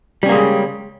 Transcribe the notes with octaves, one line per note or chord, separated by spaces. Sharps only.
C#3 G3 G#3 A#3 C#4